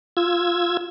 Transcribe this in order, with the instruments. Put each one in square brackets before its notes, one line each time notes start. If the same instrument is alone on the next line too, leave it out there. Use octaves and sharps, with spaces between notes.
[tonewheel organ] F4 E6 G#6